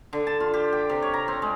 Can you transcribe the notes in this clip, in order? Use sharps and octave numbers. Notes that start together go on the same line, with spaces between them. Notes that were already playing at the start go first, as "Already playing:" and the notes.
D3
A5
F4
G4
G5
C3
C#5
A#5
C4
G#3